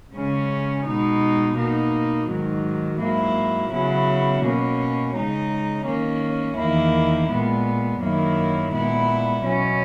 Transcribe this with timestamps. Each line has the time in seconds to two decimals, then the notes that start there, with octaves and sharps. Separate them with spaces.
0.15 C#3 G#3 C#4
0.86 B2 G#3 D#4
1.57 B2 A#3 D#4
2.29 G#2 D#3 F#3
3.00 G#2 F#3 A#3 E4
3.71 C#3 F#3 B3 E4
4.43 B2 A#3 C#4
5.15 C#3 G#3 D#4
5.86 D#3 A#3 C#4
6.57 E2 D#3 A#3 E4
7.29 A#2 G#3 B3
8.01 F#2 D#3 F#3 A#3 E4
8.72 A#2 G#3 B3 E4
9.43 B2 F#3 C#4